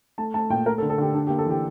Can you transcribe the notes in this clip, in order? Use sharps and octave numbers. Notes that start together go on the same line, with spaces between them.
A3 A5
A3 A5
A#2 G5
A3 A#4
A4
D3
A4
D3 G4
D4 G4
G4
A#3
A4
E3 G4